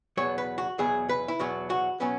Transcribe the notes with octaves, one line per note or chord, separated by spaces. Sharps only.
E2 B2 F#3 B3 C#5
B4
F#4
E2 B2 F#3 B3 G#4
B4
E4
E2 B2 F#3 B3 F#4
F#4
B2 F#3 B3 C#4